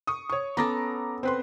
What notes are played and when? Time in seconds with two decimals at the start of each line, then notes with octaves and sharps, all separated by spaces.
0.07 C#6 D#6
0.30 C#5 C#6
0.57 B3 C#4 A4 A#5 D6 A#6
1.23 C4 B4 C6